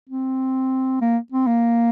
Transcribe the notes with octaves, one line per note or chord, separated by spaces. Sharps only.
C4
A#3
C4
A#3